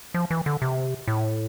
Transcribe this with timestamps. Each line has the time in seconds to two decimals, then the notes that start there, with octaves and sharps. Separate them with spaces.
0.14 F3
0.31 E3
0.46 D3
0.62 C3
1.08 A2